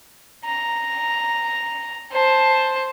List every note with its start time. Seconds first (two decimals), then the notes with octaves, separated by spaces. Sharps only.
0.45 A#5
2.12 C5 A5